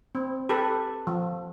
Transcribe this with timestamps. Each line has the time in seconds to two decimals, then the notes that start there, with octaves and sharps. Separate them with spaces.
0.15 C4
0.49 G4 A4 B4
1.07 F3